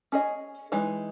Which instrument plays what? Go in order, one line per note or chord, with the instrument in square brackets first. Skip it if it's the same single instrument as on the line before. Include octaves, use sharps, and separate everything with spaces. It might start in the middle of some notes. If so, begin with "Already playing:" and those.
[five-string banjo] C#4 G#4 D#5
E3 G#3 D#4